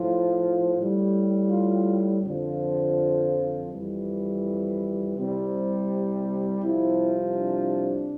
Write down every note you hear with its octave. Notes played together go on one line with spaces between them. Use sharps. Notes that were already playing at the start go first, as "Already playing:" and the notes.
Already playing: A2 F3 F4
A2 G3
F4
F2 D3 F3
F2 E3 G3
C2 C3 G3 C4
C2 C3 F3 E4
D4